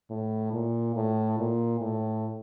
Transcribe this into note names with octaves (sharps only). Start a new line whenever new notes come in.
A2
A#2
A2
A#2
A2